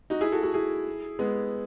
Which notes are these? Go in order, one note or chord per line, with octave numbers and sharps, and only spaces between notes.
D#4 F#4
E4 G#4
F#4 A4
F#4 A4
E4 G#4
G#3 B3